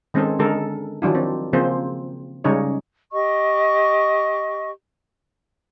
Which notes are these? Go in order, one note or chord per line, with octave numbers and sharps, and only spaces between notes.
D#3 G#3 C4 C#4 G#4 A4
D3 G#3 A4 A#4
D#3 F3 F#3 D4 E4
C4
C#3 F3 A#3 C4 G#4 C5
C#3 G3 G#3 C#4 D#4 C#5
G4 D#5 C#6